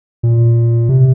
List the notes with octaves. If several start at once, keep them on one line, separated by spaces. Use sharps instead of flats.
A#2
C3